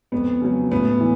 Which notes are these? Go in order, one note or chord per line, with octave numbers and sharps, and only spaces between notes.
F2 B3
C#3 F#3
A2 B3
E3